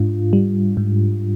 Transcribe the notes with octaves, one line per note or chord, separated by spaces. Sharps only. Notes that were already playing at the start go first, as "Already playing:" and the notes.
Already playing: G#2 D4 F4
G3
G#2